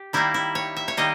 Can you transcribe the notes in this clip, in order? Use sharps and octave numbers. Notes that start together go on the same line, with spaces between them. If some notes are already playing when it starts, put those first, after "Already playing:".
Already playing: G4
D#3 G3 A#3 E4
E4
C#5
E5
C#5
D#3 G3 A#3 D#5